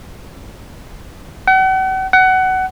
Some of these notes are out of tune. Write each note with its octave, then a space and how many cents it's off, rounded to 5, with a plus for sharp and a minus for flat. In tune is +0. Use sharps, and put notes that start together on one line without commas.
F#5 +40
F#5 +20